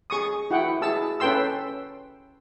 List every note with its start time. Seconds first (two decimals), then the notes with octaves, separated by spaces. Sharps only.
0.10 G#4 C#6 D#6
0.50 E4 F#4 F#5 G5
0.82 E4 G#4 A5 E6
1.20 C#4 A4 B4 G5 C6 E6